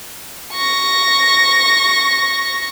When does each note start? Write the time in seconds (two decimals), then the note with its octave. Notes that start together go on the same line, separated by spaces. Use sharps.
0.54 C#6 A#6